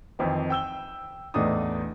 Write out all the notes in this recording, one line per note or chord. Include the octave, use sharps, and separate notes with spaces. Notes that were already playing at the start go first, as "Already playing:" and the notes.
F2 D#3 E3 C4
G5 E6 G7
A1 E2 A3 D4 D#4 D#6